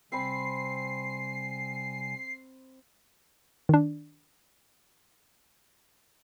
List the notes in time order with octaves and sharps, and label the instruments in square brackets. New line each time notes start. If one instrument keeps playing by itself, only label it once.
[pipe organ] C3 G3 G#5 [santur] C4 B5 [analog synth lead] C7
[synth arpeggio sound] D#3 D4